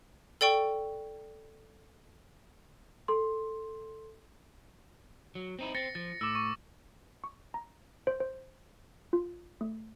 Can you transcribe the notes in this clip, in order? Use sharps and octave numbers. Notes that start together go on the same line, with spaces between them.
A4 D5 G5 C#6
A4 C6
F#3
C4 D#4 E4
C4 A6 A#6 C#7
F3 A6
A2 D6 E6
C#6
C#6
A#5
C5
C5
F4
A3